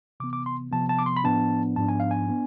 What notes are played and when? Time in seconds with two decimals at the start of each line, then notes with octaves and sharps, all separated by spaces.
0.20 C3 E3 B3 D6
0.33 D6
0.46 C6
0.71 C3 F3 B3 A5
0.89 A5
0.99 D6
1.06 C6
1.17 B5
1.24 A2 F3 B3 D4 A5
1.76 G#2 F3 B3 D4 A5
1.88 G#5
2.00 F5
2.11 G#5
2.28 B3 D4